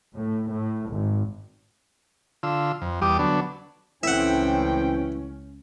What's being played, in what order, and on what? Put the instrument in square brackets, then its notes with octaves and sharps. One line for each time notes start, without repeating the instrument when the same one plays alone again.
[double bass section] A2
A2
G#1
[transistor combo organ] D3 F4 E6
F2
E2 G3 G4 D6 D#6
D3 F#3 B3 D4
[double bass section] C#2 C#4 [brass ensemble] A2 C4 G5 [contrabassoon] E3 [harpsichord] E5 F#5